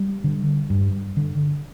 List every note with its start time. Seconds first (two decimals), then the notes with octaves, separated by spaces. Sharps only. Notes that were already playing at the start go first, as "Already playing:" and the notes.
Already playing: G3
0.24 D3
0.70 G2
1.17 D3